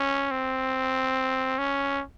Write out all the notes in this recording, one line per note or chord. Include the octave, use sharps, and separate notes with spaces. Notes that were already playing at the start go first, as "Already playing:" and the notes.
Already playing: C#4
C4
C#4